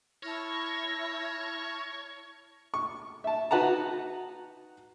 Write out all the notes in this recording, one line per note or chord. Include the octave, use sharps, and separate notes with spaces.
E4 C#5 A5 C#6 F6 A#6
C#6
E5 A5
D#4 F#4 B4 F#5 A5 A#5